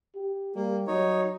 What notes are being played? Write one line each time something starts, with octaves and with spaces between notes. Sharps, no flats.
G4
G3 A#3
F#3 D#4 C#5